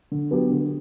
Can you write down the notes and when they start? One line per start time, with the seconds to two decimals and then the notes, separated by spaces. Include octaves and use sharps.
0.12 D3
0.31 F#3 B3 D4 G4
0.50 D3